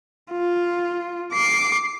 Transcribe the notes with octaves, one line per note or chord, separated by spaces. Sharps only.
F4
D6 C7